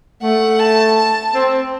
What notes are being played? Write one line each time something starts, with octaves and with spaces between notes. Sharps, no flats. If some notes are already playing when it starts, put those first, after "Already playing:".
A3 F#5
A5
A5
C4